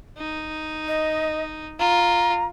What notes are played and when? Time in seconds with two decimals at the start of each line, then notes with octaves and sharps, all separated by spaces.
0.17 D#4
0.88 D#5
1.79 F4 A#5